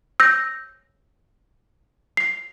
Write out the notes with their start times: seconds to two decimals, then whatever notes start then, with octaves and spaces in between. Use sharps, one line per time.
0.20 E6 G6 A#6
2.17 C7